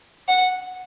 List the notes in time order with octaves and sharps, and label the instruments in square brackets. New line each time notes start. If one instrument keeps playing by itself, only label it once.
[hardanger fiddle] F#5